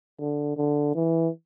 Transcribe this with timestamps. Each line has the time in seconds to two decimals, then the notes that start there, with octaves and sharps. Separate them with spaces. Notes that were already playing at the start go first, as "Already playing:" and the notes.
0.20 D3
0.57 D3
0.95 E3